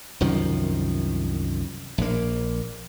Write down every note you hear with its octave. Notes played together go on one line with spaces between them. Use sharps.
C2 F#2 D#3 F3
A#1 A#3